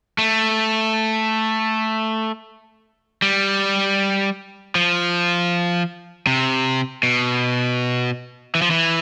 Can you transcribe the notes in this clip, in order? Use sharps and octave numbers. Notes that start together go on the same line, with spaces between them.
A3
G3
F3
C3
B2
E3
F3
E3